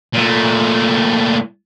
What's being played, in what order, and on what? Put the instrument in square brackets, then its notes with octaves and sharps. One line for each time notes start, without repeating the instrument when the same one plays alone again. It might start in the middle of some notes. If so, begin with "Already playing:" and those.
[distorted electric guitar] A#2 A3